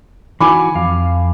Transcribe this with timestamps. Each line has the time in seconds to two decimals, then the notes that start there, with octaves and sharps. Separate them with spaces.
0.41 E3 F#4 G#5 B5 D6
0.75 F2 F5